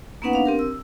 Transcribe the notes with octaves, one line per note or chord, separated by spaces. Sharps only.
A#3 B3 C#4 D#4 B4 F#5
D4 F5
C4 G4 A#4
E6